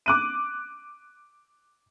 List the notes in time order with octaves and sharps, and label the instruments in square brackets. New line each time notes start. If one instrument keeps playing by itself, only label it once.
[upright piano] D6 F#6 D#7